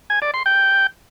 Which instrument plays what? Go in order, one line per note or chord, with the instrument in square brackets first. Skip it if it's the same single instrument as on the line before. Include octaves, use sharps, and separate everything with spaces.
[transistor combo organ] G#5
D5
C6
G5